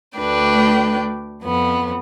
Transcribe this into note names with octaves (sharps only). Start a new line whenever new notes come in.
D2 A3 D4 B4 G5
F2 B3